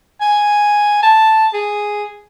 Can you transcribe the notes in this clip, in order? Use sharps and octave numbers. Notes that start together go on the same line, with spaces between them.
G#5
A5
G#4